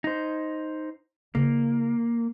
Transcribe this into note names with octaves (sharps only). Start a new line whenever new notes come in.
D#4 C5
C#3 A#3 E4